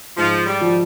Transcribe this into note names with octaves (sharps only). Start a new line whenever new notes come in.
G#2 F3
G3
F3